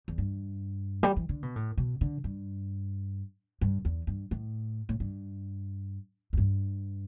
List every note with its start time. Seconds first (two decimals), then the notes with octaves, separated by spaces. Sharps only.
0.08 E2
0.18 G2
1.03 G3
1.17 E3
1.29 D3
1.43 B2
1.56 A2
1.78 B2
2.01 D3
2.24 G2
3.61 G2
3.85 E2
4.07 G2
4.31 A2
4.89 A2
5.00 G2
6.33 E2
6.37 G2